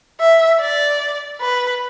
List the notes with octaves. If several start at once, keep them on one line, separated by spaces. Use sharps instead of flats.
E5
D5
B4